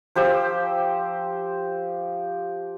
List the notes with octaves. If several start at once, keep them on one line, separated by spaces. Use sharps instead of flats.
F3 G4 C5 E6